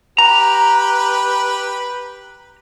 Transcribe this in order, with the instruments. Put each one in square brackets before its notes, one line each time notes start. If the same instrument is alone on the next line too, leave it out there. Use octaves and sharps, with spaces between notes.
[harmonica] G4 B4 [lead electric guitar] A#5